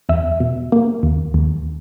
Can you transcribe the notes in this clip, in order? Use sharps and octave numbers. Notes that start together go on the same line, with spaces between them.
E2 E5
B2
A#3
D#2
D#2